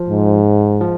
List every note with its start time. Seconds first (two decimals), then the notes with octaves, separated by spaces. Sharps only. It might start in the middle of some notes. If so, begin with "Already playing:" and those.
Already playing: F3
0.09 G#2
0.80 F3